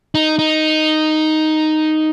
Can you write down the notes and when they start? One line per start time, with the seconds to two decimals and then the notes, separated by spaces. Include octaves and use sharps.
0.15 D#4
0.39 D#4